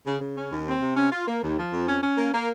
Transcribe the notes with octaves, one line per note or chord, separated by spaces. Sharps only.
C#3
C#3
C#4
D#2
C4
C3
C#4
F4
A#3
D#2
F3
F2
C#4
C#4
A#3
A#3